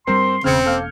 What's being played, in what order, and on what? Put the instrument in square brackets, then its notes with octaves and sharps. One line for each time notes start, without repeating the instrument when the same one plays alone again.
[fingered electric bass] G2 G3 [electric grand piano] C4 A#4 C5 [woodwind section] C6
[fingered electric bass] E1 E2 C#4 [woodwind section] C#3 [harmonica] C4 [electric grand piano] F6 G#6 C#7
[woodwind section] A#3 [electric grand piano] A4 F6 G6